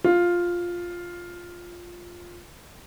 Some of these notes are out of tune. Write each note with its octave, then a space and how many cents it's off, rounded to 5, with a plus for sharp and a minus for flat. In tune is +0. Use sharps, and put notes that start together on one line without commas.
F4 +5